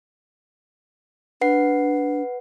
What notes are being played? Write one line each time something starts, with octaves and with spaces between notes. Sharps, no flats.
D4 B4 F#5 C7